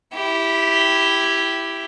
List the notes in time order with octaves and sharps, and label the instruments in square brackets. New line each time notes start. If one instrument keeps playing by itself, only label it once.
[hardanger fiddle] E4 G4